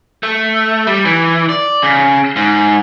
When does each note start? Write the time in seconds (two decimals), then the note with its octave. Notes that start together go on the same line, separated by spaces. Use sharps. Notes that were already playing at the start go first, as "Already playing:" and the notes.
0.23 A3
0.87 G3
1.05 E3
1.49 D5
1.82 C#3
2.36 G#2